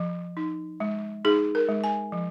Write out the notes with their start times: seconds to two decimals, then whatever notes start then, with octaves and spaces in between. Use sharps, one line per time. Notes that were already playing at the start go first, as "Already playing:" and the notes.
Already playing: F3
0.37 D#4
0.80 G#3
1.25 D#4 G#4
1.55 A#4
1.69 G#3
1.84 G#5
2.12 F3